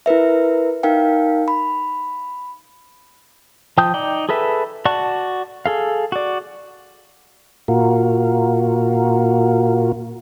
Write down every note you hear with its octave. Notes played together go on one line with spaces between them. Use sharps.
E4 A#4 B4 E5
D#4 A#4 F5 G5
B5
F3 G5 A5 D#6 G6
D#4 D5 G5
G#4 A4 B4 E5
F#4 D5 F#5 A5 C#6
G#4 A4 F5
F#4 D5
A#2 F4 F#4 A#4